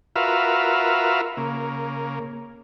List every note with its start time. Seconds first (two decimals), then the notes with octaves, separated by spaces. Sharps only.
0.16 F4 F#4 A#4 B4 E5 F5
1.37 C#3 A#3